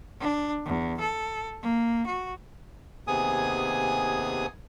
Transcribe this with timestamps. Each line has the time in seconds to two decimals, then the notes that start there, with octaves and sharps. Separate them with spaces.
0.20 D4
0.66 E2
1.00 A4
1.62 A#3
2.06 F#4
3.07 D#2 C3 B3 G#4 G#5 D#6